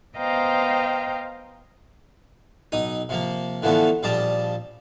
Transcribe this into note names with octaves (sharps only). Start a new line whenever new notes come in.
B3 C5 D#5 F5 G5 A#5
B1 D#4 D#6
C3 F3 A#3
D3 E3 F3 A3 B3
A#1 F3 G3 D5 D#5 A5